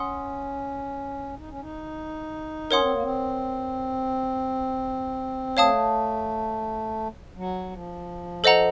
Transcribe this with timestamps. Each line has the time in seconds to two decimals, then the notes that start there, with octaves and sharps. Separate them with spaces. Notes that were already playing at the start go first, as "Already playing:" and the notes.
Already playing: C#4 F#5 C6 D#6
1.38 D#4
1.50 C#4
1.61 D#4
2.70 C#4 A#4 C#5 F#5 C6 D#6
2.81 C4
2.92 A#3
3.03 C4
5.57 A3 C#5 F5 A5 D#6
7.36 F#3
7.71 F3
8.44 A4 C5 D#5 F#5 A#5